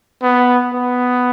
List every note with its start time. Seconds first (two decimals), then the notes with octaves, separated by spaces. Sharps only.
0.22 B3
0.73 B3